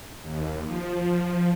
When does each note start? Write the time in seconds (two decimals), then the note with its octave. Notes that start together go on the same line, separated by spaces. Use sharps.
0.23 D#2
0.65 F3